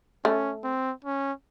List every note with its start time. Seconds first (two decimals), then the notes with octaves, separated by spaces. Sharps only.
0.25 A3 C#4
0.64 C4
1.05 C#4